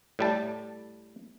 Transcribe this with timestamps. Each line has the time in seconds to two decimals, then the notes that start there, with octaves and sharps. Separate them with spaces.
0.19 A2 G3 A5